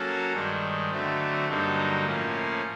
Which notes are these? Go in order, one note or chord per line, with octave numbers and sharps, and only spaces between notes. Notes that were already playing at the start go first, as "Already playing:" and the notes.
Already playing: F#3 A#3 C#4 F#4 A4
G2 D#3 G#3
D3 F#3 A3 C4
G2 D3 F#3 A#3 D#4
A2 F3 A#3 C#4